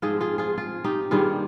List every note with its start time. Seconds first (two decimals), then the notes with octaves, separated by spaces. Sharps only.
0.02 G#2 F3 C4 F4 G#4
0.20 F4 G#4
0.38 F4 G#4
0.58 F4
0.84 D#4 G4
1.11 G2 D#3 G3 A#3 F4 G#4